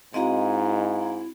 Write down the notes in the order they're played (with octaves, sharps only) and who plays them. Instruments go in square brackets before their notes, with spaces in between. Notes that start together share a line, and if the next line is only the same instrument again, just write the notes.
[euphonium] G#2 [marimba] C4 F#4 [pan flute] E4 [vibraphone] D#5 F5 A#5